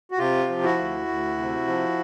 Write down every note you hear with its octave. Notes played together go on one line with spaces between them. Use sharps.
F#4
C3 F4 G4
F3
E4 F#4
D2
D2
C3
F3